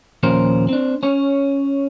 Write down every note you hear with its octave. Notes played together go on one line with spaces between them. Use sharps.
D#2 A#2 F3 C#4 A#4 C5
C4 D4
C#4 C#5